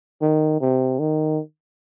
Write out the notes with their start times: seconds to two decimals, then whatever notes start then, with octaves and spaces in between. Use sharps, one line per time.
0.22 D#3
0.61 C3
0.99 D#3